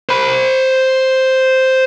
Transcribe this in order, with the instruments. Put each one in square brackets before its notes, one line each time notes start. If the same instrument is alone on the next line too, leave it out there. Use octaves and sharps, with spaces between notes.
[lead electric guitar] C5 B5